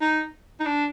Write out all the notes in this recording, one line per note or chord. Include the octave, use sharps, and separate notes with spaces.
D#4
D#4
D4